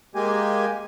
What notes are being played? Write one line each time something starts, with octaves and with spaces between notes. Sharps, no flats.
G#3 A#3 G4 G#5